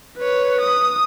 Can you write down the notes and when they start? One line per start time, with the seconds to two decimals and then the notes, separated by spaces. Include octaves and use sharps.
0.18 B4 C#5
0.61 D#6